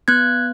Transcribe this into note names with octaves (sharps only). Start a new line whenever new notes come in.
B3 F#6 G#6